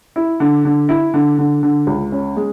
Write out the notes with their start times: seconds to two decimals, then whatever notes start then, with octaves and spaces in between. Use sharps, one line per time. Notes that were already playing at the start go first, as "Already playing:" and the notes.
0.16 E4
0.40 D3
0.65 D3
0.89 E4
1.14 D3
1.39 D3
1.63 D3
1.87 C#2
2.12 C#4
2.37 G#3